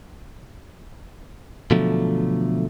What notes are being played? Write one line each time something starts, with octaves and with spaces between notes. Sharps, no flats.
B2 D3 F3 F#3 A3